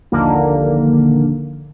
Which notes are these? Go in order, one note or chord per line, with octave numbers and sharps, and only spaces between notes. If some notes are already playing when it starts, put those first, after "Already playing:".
A#1 D#2 D3 A#3